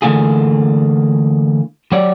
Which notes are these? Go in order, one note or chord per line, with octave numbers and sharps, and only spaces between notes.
D3 E3 A3 A#3 F4 G#4
F#3 F#4 G4 C#5 D5